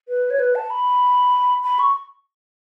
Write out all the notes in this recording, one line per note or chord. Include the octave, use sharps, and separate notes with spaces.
B4
C#5
B4
A5
B5
B5
C#6